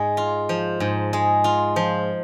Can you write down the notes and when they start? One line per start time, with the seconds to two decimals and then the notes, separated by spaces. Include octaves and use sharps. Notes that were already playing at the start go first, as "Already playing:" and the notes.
Already playing: G#2 G#3
0.17 F4
0.49 F3
0.80 G#2
1.13 G#3
1.44 F4
1.76 F3